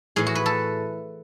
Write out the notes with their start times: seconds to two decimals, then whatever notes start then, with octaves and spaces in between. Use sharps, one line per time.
0.16 A2 E3 G#4
0.27 F#4
0.35 B4
0.46 A4